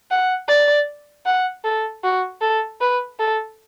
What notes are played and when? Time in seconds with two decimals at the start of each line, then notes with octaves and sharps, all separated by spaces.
0.11 F#5
0.48 D5
1.26 F#5
1.64 A4
2.04 F#4
2.41 A4
2.81 B4
3.19 A4